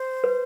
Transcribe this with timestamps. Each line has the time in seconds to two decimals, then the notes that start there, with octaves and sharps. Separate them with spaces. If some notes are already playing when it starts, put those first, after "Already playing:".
Already playing: C5
0.24 B4